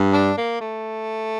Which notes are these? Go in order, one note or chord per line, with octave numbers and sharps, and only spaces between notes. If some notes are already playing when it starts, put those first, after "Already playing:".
Already playing: G2
D4
A#3
A3